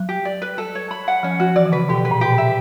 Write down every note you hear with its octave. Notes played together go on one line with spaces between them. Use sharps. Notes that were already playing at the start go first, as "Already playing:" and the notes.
Already playing: F#3
G4
D5
B4
A4
C#5
B5
F#5
F3 C#4
F3 F#4
E3 D5
D3
C#3 B4
B2 G4
B4
A#2
B2 G4
A#2
E5